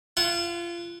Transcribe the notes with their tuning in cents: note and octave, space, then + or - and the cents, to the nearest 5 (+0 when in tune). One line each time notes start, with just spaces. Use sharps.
F4 -30 F#5 +0